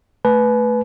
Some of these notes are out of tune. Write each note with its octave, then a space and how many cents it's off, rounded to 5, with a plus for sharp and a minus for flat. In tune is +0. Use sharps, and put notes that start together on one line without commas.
A3 +0 B4 +0 G#5 +45